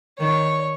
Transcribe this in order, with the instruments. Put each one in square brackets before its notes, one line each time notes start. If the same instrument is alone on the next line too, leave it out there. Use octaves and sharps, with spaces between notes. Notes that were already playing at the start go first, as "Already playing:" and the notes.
[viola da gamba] D#3 [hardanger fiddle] C#5